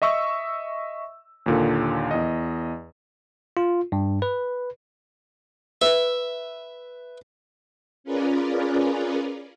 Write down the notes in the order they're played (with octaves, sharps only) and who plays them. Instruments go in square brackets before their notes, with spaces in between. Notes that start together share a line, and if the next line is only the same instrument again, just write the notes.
[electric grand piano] D#5 E5 C#6 E6
D#2 A#2 D3
E2 D#5
[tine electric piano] F4
G2
B4
[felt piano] B4 [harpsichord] E5
[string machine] C#4 F4 G#4 A#4 B4 D5